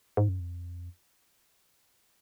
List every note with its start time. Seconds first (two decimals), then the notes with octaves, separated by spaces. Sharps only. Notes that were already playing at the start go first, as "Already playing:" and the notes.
0.17 G#2
0.29 F#2
0.40 F2